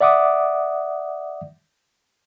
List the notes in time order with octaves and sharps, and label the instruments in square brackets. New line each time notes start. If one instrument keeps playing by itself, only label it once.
[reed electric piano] D5 E5 F#5 D6 D#6